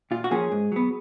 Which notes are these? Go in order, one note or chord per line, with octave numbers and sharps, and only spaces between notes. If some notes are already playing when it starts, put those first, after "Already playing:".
A#2 F4
F#4
F3 A#3 C#4 G#4
G#2
F#3 B3